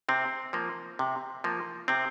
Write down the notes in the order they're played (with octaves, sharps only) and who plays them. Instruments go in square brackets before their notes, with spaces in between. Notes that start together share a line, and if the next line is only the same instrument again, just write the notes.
[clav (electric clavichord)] C3 C4
F3 A#3
C3
F3 A#3
C3 C4